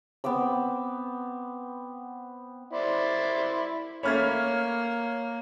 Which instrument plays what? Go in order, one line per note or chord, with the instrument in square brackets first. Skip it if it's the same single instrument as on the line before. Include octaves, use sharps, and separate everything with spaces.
[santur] B3 C4 D6 E6
[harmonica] E4 C5 D5
[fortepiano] A3 C#4 B5 [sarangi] A#3 [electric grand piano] C#5 F6 G#6